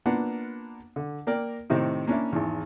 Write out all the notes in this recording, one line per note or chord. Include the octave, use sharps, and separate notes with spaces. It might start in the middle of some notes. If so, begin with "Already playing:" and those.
A#3 B3 D4 F4 F#5
D3
A#3 A#4 D5 G5
A2 C3 D#3 C4 D#4
A#3 C#4 D4 E4
G#1 E2